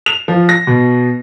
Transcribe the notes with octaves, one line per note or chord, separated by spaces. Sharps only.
F7
F3
A#6
B2